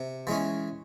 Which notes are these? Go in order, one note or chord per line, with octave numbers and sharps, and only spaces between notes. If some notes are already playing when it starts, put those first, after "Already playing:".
Already playing: C3
E3 G#3 C#4